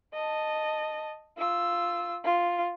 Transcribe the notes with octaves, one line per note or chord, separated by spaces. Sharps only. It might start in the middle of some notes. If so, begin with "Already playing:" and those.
D#5 A5
F4 E6
F4